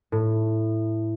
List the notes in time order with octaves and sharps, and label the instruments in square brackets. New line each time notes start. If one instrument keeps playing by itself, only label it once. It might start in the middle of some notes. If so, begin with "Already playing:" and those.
[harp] A2